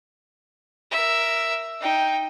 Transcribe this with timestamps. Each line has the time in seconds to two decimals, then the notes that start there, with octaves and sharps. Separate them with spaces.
0.91 A#4 E5
1.81 D#4 G5